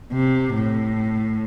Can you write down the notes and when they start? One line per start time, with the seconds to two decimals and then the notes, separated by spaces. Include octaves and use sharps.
0.13 C3
0.54 A2